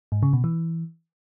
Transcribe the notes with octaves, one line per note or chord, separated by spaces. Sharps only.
G#2
C#3
B2
E3